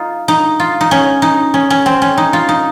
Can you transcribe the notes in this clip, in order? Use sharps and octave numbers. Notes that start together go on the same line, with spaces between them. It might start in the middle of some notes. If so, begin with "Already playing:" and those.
Already playing: D#4 F4
D#4
F4
D#4
C#4
D#4
C#4
C#4
C4
C#4
D#4
F4
D#4